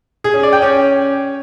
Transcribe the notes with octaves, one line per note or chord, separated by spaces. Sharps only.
G#4
C#4
D5
G5
C#4